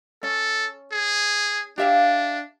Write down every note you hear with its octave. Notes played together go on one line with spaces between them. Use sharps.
C#4 A4
G#4
D4 G4 E5 F5